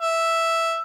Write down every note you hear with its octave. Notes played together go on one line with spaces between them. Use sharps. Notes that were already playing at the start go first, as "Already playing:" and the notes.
E5